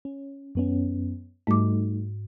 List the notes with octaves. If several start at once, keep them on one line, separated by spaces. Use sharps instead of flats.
C#4
F#2 B3 C#4
G#2 G3 A3 D#4 D6